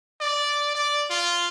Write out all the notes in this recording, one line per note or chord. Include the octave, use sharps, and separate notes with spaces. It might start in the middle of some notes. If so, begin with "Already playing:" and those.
D5
D5
F4